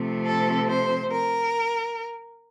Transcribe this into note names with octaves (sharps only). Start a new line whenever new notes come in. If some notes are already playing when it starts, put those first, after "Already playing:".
Already playing: C3 F3 A3 C4
A4
C5
A#4